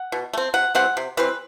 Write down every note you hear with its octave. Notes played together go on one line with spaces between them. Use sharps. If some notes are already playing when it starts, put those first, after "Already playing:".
Already playing: F#5
B2
A3
C4
C3 F#5
E3 G3 C4 F#5
C3
E3 G3 C4 B4